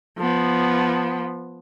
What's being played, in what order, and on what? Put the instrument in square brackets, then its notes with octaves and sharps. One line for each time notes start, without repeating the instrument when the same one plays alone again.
[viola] F3 B3